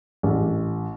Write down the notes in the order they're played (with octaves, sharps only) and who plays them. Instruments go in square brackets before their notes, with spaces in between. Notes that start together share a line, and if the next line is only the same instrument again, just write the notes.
[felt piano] A1